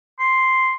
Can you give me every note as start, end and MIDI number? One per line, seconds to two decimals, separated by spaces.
0.20 0.73 84